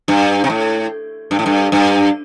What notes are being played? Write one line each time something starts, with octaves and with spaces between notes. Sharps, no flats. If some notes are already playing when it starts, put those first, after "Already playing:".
G2
C3
A2
G2
A2
G2
G2